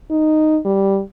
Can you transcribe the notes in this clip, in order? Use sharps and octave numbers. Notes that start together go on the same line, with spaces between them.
D#4
G3